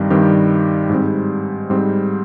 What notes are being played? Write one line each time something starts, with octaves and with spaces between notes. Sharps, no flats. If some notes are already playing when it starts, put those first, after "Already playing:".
Already playing: G2 D#3 G3 C4
G2 D#3 G3 C4 G4
G#2 G3 C4
G#2 G3 C4